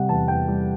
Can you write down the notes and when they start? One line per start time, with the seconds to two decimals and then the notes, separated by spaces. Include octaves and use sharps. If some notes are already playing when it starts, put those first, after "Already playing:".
Already playing: C3 G3 F#5
0.09 E2 A5
0.28 E2 G5
0.48 G3